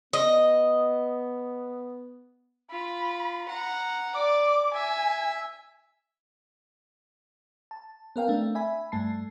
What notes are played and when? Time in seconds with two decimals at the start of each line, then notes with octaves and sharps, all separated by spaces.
0.13 B3 D#5
2.71 F4 B5
3.48 F#5 A#5
4.14 D5 D6
4.74 E5 G#5
7.71 A5
8.16 B3 A#4 F5 G5
8.28 A3 C4 D4
8.55 E5 G#5 B5
8.92 G2 A3 A5 C7